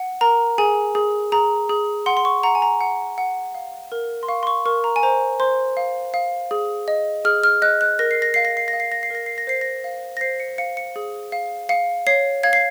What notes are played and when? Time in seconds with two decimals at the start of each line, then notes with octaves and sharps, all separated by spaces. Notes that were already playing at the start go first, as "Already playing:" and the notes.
Already playing: F#5
0.21 A#4 A#5
0.58 G#4 G#5
0.95 G#4
1.32 G#4 A#5
1.69 G#4
2.06 F#5 C6
2.17 C6
2.25 C#6
2.43 F#5 A#5
2.55 G#5
2.62 A#5
2.80 F#5
3.18 F#5
3.55 F5
3.92 A#4
4.23 C6
4.29 F5 C#6
4.43 C6
4.47 C#6
4.66 A#4 C#6
4.84 A#5
4.96 G#5
5.03 C5 A#5
5.40 C5 C6
5.77 F5
6.14 F5
6.51 G#4
6.88 D#5
7.25 G#4 F6
7.44 F6
7.62 D#5 F#6
7.81 F#6
7.99 A#4 A#6
8.11 C7
8.22 A#6
8.34 F5 C7
8.45 A#6
8.57 C7
8.68 A#6
8.73 F5
8.80 C7
8.92 A#6
9.03 C7
9.10 A#4 A#6
9.26 C7
9.38 A#6
9.47 C5 C7
9.61 A#6
9.84 F5
10.17 A#6
10.21 C5 C7
10.40 C#7
10.58 F5 C#7
10.77 C#7
10.96 G#4
11.32 F5
11.69 F5 C#7
12.07 C#5 C7
12.43 F5 G#6
12.53 C7